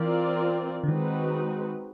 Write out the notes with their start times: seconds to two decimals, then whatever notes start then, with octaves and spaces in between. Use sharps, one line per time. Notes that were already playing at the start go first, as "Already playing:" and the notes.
Already playing: E3 C4 F4 A#4 D5
0.84 D3
0.88 D#3 G#3 C4 D#4 F#4 B4